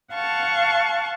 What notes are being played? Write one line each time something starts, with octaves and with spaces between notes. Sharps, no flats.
F5 F#5 A5 C#6